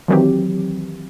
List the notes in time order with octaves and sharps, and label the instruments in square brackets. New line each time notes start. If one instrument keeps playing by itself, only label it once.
[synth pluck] D#3 E3 F#3 C4 G4